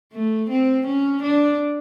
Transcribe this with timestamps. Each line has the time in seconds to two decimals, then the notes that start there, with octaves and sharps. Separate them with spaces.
0.13 A3
0.50 C4
0.86 C#4
1.23 D4